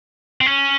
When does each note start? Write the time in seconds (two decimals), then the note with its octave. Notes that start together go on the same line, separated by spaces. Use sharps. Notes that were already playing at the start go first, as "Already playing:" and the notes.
0.41 C4
0.46 C#4